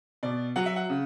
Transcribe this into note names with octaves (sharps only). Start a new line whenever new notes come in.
B2 D5
F#3 F#5
E5
F#5
C#3